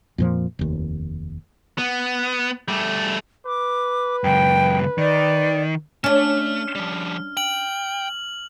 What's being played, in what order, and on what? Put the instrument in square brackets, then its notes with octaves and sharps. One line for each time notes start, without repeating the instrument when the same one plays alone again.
[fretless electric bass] F2 A#2 F3
F1 D#2
[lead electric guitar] B3
G3 A3
[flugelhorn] B4 [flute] D6
[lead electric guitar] C#2 F#2 [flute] G5
[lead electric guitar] D#3 [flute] D5
[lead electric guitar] A3 [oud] C#4 D4 [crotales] F6
[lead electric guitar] F3 G3
[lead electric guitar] G5 [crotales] F#7